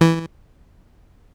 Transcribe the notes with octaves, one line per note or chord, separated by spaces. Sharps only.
E3